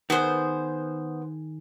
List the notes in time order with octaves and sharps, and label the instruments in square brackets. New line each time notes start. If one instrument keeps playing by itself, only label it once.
[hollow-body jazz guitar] D#3 G#4 [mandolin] B3 C5